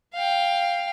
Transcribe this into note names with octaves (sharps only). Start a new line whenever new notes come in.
F5 G5